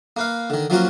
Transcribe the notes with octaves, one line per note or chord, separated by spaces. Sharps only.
A#3 B4 F5
D3 D#3
F3 F#3 A#3 C#4 F4 F#4